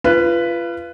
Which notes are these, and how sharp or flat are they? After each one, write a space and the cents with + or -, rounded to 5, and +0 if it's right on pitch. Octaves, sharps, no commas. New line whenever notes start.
F4 -30 B4 +0